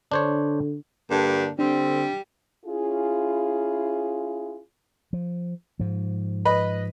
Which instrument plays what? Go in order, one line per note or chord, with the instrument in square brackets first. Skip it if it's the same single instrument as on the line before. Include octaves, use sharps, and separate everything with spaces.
[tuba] D3 [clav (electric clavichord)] D4 C5 C#5
[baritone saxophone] G2 [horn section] D3 A#3 D4
[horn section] D3 C4 [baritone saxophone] G3 [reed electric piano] D4
[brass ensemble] C#4 E4 F4 G#4
[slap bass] F3
G#2 F3
[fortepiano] B4 D#5 B5